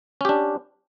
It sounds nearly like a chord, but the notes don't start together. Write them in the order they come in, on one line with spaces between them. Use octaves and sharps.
C#4 G4 D4